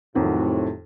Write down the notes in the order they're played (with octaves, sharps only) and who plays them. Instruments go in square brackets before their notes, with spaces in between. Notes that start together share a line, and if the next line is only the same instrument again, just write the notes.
[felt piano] F2 D#3 [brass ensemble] A2 C3 F#3